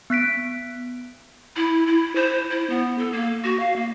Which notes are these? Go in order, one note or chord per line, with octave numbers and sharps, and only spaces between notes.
B3 F#6 B6 D7
E4
E4
C5
E4
B3
A4
A#3
F#4
F5
A#3